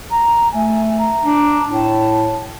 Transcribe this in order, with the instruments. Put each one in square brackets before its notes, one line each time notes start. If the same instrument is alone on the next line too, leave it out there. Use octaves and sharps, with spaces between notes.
[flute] A#5
[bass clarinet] A3 [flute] G#5
[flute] A#5
[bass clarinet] D4
[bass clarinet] A2 [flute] A5